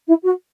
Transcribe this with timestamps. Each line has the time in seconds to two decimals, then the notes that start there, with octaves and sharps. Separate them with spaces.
0.08 E4
0.23 F#4